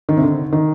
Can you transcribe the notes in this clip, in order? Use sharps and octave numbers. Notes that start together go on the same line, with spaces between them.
D#3
C3
D3
D#3